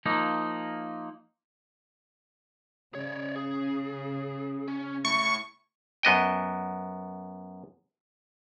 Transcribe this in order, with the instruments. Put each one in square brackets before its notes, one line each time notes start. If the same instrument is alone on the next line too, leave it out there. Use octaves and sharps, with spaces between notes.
[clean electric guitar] F3 A#3 D#4
[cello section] C#3 [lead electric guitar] C#5 D5
[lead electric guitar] G#4
C#4
[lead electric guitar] A3 E4 [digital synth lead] C#6
[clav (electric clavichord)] F#2 B3 D#5 G5